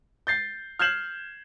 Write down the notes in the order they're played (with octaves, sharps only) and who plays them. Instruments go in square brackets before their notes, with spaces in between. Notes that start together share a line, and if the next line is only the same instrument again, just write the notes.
[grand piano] G6 A6 C7
F6 G6 G#6 C7 E7 F#7